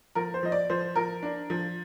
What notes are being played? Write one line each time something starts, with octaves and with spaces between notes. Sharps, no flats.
F3 A#4
C5
F3 D#5
D5
F3 C5
F3 A#4
D4
F3